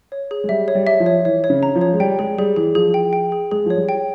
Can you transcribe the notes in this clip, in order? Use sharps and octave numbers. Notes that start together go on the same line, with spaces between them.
C#5
G#4
G#3
G3 E5
C#5
G3
E5
F3
C#5
E3 C#5
C#5
C#3
A#5
F3
C#5
G#3
G3 G5
G#3 G#4
G3 G#4
E3 G#4
F3 G#4
G5
G5
G#4
G#3 G#4
F3 C#5
G3
G5